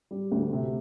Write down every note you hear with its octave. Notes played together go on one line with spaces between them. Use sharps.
G3
D2
C3